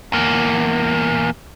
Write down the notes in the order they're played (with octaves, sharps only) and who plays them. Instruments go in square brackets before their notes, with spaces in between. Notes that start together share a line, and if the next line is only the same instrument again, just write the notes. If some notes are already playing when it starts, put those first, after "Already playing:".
[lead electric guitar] E2 A#3